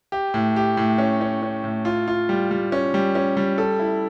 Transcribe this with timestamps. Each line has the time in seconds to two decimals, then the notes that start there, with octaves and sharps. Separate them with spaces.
0.12 G4
0.34 A2
0.56 G4
0.77 A2
0.98 C#4
1.21 C#4
1.43 C#4
1.64 A2
1.85 F4
2.08 F4
2.29 G3
2.51 G3
2.72 C#4
2.94 G3
3.15 C#4
3.37 G3
3.58 A4
3.80 E4